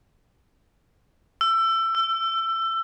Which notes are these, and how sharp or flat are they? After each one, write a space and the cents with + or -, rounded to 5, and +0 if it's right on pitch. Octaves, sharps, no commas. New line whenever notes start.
E6 +25
E6 +35